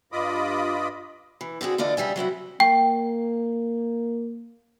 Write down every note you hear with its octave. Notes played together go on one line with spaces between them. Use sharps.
G2 F4 D#5 B5 D6 D#6
E3
D3 C4 F#4 G#4
E2 D3 F4 D5 D#5
C#3 G3 E5 G#5
F#3 C4 E4 F#4
A#3 G5